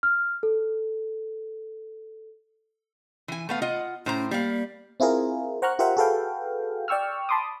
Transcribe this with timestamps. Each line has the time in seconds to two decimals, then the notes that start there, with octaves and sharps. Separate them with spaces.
0.03 F6
0.43 A4
3.28 E3 G#5
3.49 A3 B3 F5
3.62 F4 D#5 F#5
4.06 A2 C#4 C5 A#5
4.31 G3 A#3 F5
5.00 C4 E4 F4 G#4 A#4
5.62 C5 F#5 A#5 C#6 F6 F#6
5.79 F4 G4 A#4 C5 E5 F#5
5.97 F#4 G#4 A4 B4 F5 G5
6.88 D5 G5 C#6 E6 F6
7.29 A5 B5 C6 D6 D#6